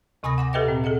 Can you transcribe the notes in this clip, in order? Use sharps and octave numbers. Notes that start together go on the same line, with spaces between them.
D2 C3 G#5 B5 D#6 A#6
F#5 D6 A#6
G4 A4 B4 D#5 E5 G5
A#2 C4
G#4 A4 D#5 F#5